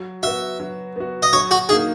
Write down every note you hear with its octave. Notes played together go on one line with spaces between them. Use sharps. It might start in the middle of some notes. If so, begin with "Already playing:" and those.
Already playing: F#3
B3 F#4 E5
F#3
B3 F#4
D#5
F#3 C#5
F#4
A#3 D#4 G#4